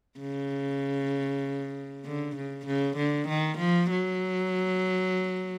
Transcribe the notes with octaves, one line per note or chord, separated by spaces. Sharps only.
C#3
D3
C#3
C#3
D3
D#3
F3
F#3